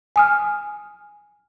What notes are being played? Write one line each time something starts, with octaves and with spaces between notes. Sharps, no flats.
G#5 D#6 F6